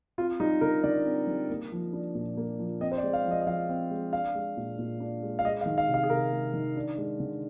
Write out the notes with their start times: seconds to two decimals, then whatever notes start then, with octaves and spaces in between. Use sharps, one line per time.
0.18 C4 F4
0.40 G3 D#4
0.61 D3 A#4
0.83 D3 D5
1.06 C4
1.27 G3
1.50 A#3
1.72 F3
1.93 D4
2.15 A#2
2.37 A#3
2.59 F3
2.81 C4 D#5
2.92 C5
2.98 D5
3.03 G#3
3.13 F5
3.26 F3
3.31 D#5
3.41 D#5
3.47 F3 F5
3.69 C4
3.91 G#3
4.12 D4 F5
4.35 G#3
4.57 A#2
4.79 A#2
5.00 D4
5.22 G#3
5.39 F5
5.44 G#3 D#5
5.61 F5
5.66 D#3
5.78 F5
5.88 C3
5.94 F5
6.03 G#4
6.10 C3 A#4
6.32 G#3
6.54 D#3
6.76 D4
6.98 G#3
7.20 D3